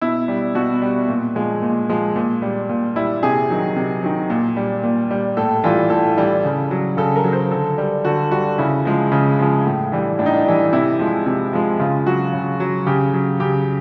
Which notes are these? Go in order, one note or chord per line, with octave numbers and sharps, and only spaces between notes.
B2 E4
G3
B2 F#4
G3
A#2
F3 G#3
A#2
F3 G#3
A#2
G3
A#2
G3 E4
C3 G#4
D#3 F#3
C3
D#3 F#3
A#2
G3
A#2
G3
A2 A4
E3 G3 F4
A2 A4
E3 G3
C#3
F#3
C#3 A4
A#4
F#3
C5
D3 A4
G3
D3 F#4
G3 F#4
C#3 E4
F3 G#3
C#3
F3 G#3
A2
E3 G3
A2 D4
D#4
D4
E3 G3
C3 E4
F3 G#3
C3
F3 G#3
C#3 F4
F#3 F#4
C#3
F#3
C#3 G4
F#3
C#3 G4